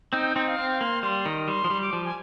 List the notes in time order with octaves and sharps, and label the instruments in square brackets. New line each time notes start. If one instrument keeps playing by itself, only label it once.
[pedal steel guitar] C4 D#4 [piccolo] G5
[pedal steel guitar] C4 D#4
[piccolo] F5
[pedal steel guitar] C4
[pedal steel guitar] A#3 [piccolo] C6
[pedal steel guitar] G3 [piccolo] C6
[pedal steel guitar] D#3 [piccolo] A#5
[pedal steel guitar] G3 [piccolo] C6
[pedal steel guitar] F3
G3
[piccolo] D6
[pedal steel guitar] F3
[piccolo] G#5